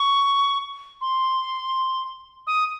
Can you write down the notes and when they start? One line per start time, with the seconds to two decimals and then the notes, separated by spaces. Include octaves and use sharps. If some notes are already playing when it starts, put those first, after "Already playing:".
Already playing: C#6
1.01 C6
2.47 D#6